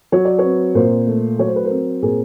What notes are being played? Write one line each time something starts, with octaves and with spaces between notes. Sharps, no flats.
F#3 C#5
D5
C4 B4 C#5
A#2 A#4 C5
A3
F#3 C#5
C5
B4
A#4 C5
C4
A#2 G#4 A#4